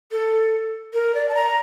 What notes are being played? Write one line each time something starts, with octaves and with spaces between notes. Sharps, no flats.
A4
A#4
D5
A5
A#5